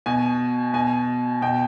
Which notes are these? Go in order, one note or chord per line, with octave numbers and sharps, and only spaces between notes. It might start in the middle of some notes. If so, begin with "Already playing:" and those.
B2 G#5
B2 G#5
B2 G5